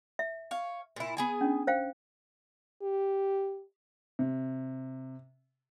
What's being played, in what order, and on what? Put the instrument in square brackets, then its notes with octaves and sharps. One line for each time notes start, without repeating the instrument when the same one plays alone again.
[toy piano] E5
[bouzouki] C#5 F5
A#2 E4
B3 G#4 G#5
[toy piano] C#4 D4
C5 F5 G5
[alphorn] G4
[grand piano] C3